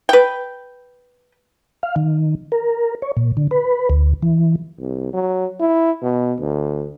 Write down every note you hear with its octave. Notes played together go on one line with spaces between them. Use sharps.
B4 G5
F5
D#3
A#4
C#5
A#2
D3
B4
D2
E3
C2
F#3
E4
B2
D2